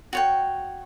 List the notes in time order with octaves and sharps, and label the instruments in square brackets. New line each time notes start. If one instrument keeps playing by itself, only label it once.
[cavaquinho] F#4 C#5 G5